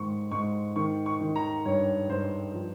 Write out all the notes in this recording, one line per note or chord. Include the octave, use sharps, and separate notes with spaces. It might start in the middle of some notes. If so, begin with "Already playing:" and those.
Already playing: G#2 D#3 C#6
G#2 C#6
D#3 C#6
C#6
D#3
A#5
G2 C#5
G2 C5
F3